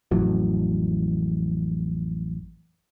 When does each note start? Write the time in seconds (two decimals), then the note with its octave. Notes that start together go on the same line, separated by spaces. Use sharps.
0.11 A1 F2 E3 F#3